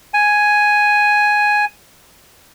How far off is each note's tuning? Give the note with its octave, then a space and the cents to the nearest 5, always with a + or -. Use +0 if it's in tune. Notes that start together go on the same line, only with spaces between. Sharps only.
G#5 +5